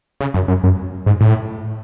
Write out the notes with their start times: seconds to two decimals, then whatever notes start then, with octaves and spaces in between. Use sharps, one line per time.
0.21 C#3
0.34 F#2
0.48 F#2
0.64 F#2
1.06 G#2
1.21 A2